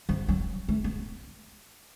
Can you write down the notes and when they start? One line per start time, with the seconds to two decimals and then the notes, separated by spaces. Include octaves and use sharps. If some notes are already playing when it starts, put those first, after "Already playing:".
0.09 F3
0.28 F#3
0.68 A3
0.84 B3